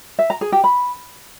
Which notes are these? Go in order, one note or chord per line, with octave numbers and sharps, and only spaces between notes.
E5
A#5
G#4
G4
B5